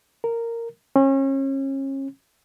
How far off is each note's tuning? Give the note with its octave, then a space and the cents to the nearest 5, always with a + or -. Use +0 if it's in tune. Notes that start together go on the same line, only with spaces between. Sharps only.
A#4 -10
C#4 -35